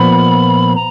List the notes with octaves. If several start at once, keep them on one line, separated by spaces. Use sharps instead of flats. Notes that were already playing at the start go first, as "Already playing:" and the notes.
Already playing: A#2 F3 B3 B5
A#5